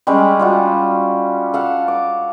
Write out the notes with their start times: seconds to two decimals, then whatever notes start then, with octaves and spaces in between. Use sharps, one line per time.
0.07 G3 G#3 C#4
0.39 G3 F4 F#4
1.54 A4 F5 F#5
1.88 D6